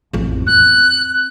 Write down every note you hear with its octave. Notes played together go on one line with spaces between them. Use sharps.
A1 F2
C4 F#6